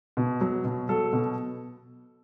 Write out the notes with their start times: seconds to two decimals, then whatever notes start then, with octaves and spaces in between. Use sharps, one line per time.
0.17 B2
0.41 F#3
0.64 B2
0.89 F#3 A4
1.13 B2